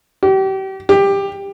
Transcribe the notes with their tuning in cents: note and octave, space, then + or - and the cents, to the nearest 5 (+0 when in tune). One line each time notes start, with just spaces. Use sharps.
G4 -35
G4 +15